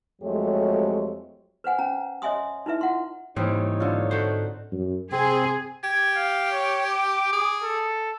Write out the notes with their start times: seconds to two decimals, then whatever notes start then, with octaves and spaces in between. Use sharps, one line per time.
0.22 F2 F#3 G#3 A3 G4 C#5
1.64 B4 C5 F#5 G#5
1.79 C#4 A#5
2.22 C#5 D#5 E5 G#5 C6 D#6
2.66 D#4 E4 B4 E5
2.81 F4 F#5 C6
3.36 G#2 E3 G3 A#3 C4 D#4 C#5
3.80 D3 F4
4.11 F#4 A4 C5
4.72 F#2
5.12 C3 C4 G#4
5.84 G4 G#6
6.16 F5
6.52 C#5
6.87 D6
7.33 G#4
7.63 A4